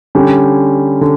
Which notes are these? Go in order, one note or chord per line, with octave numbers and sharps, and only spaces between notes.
D3 G3 C#4 G4
D3